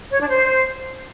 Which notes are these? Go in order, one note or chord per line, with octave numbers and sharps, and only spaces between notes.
C#5
D4
C5